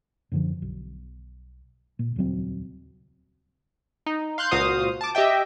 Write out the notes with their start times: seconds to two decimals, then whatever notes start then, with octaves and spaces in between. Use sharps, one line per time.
0.32 F#2 D3 F3
0.62 B1
1.99 A#2
2.16 D#1 C#2 F#3 C4
4.06 D#4
4.38 F5 C6 F#6 G6
4.51 C#2 A#2 F#4 C5 F5 D#6
5.01 A5 D6
5.15 G4 D#5 E5 G5